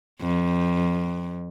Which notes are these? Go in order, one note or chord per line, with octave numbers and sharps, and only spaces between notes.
F2